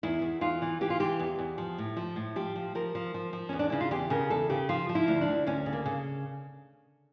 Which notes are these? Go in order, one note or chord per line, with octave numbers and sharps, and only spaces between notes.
E2 E4
E2
E2 F4
E3
E3 G4
F4
E3 G4
E2
E2
F3
A2
F3
A2
F3 G4
F3
F3 A#4
F3
F3
F3
E2 C#4
D4
C#3 E4
F4
E2 G4
C#3 A#4
E2 A4
C#3 G4
F3 F4
F3
E4
D2
D4
D2
D2 C#4
C#3
A#3
C#3